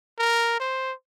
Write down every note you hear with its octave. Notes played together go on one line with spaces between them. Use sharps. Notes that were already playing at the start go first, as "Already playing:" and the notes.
A#4
C5